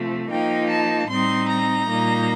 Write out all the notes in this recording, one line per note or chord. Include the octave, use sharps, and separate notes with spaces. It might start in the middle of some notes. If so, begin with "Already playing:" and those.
Already playing: C3 F3 A3
F3 A#3 D#4 G5
A5
A2 G3 C4 D#4 C6
A#5
A#2 G3 A#3 D#4